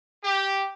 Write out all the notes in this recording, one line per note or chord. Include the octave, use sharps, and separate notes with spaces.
G4